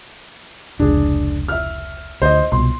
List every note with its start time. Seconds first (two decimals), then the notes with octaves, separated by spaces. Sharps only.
0.79 F1 C#2 D4 G#4
1.48 E5 F6
2.22 D2 C5 D#5
2.52 C2 B2 C6